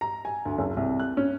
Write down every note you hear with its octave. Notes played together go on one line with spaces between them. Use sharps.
A#5
G#5
D2
F#1
C2
F#6
C#4